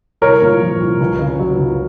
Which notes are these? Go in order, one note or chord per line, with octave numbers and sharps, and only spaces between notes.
C2 A#4 C#5
A#2
F3
C2
C#2
C#3
F#3
C#2